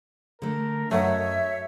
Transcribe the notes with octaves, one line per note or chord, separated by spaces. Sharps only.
D3 A3 A#4
F#2 F#3 A3 C#5 D#5 E5